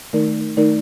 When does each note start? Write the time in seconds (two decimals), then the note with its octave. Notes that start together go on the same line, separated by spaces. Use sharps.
0.13 D#3 A3 D#4 A#4 D5
0.57 D#3 A3 D#4 A#4 D5